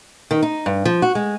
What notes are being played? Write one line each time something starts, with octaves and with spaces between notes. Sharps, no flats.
D#3
D#4
G2
F3
F#4
G#3